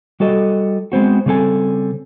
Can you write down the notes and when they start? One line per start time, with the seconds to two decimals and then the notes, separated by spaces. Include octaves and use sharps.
0.20 G3 F#4 A4 D#5
0.92 G#3 B3 C4 F#4
1.26 C#3 G3 C4 A4 G#5